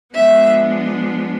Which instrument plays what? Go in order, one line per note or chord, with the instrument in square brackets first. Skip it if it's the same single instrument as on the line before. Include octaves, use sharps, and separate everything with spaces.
[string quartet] F3 G#3 B3 D4 E5